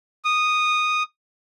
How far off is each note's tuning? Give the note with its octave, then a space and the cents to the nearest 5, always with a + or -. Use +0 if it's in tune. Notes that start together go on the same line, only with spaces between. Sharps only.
D#6 -10